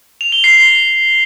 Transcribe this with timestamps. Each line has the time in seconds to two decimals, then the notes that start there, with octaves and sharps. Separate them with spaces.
0.21 F7
0.32 G7
0.44 C7